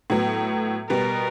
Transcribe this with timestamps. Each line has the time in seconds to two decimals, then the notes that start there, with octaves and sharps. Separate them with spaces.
0.10 A2 F#3 B3
0.89 B2 G3 B3 A#4